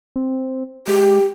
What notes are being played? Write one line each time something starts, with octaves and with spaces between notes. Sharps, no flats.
C4
G#3 G4